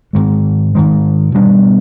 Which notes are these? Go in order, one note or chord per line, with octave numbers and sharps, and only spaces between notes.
G#2 D#3 G#3
G#2 D#3 G#3
B2 G3 B3 D4